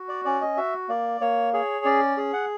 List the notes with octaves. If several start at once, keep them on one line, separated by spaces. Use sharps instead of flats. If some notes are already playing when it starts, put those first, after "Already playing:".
Already playing: F#4
D5
C#4 D5
D#5
F#4 E5
A#3 D5
A#3 C#5
G#4 C#5
C#4 D5
G#4
F#5